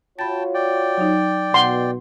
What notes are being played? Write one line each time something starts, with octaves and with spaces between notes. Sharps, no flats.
F4 F#4 C#5 G5 A5 B5 A6
D5 G5
F#3 D#4
B2 F#5 C6